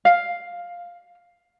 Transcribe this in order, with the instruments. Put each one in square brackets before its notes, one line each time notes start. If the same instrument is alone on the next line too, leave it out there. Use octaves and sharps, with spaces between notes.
[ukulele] F5